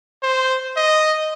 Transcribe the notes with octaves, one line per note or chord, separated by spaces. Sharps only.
C5
D#5